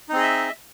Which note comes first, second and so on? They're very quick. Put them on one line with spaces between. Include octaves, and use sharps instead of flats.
D#4 C4 G#4 D#5 E5